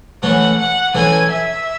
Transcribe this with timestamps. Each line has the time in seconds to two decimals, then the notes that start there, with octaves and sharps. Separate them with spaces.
0.23 E3 A3 C#4 F#5
0.58 F#5
0.95 E3 A3 C#4 G#5
1.31 E5